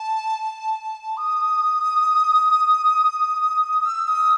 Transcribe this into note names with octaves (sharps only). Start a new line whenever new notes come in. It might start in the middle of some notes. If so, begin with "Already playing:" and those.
Already playing: A5
D#6
E6
D#6